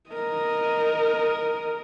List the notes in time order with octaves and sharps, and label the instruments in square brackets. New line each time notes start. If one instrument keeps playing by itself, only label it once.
[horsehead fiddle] A#4 D#5